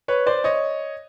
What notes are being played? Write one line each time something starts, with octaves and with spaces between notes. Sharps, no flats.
B4 C#5
C5 D5
C#5 D#5